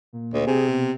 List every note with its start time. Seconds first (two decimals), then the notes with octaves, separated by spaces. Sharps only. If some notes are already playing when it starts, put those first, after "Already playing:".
0.13 A#2
0.34 D2
0.47 C3 G#4
0.68 B2